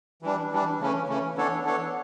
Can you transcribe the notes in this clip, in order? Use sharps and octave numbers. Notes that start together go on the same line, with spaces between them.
E3 G3 D4
E3 G3 D4
C#3 E3 A3 C#4
C#3 E3 A3 C#4
E3 B3 D4 A4 C#5
E3 B3 D4 A4 C#5